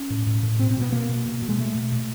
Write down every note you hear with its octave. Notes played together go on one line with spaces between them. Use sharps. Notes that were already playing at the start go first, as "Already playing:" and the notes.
Already playing: C#4
A2
A2
A2
B2 C4
C4
B2 B3
B2 A#3
B2
B2
B2
G#3
B2 A3
B2
A#2